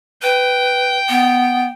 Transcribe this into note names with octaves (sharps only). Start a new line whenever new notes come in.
B4 G5
B3